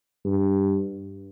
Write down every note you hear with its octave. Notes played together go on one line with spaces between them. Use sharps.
G2